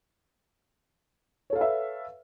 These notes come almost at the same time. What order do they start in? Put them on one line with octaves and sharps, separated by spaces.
C#5 A4 F5 B4 E5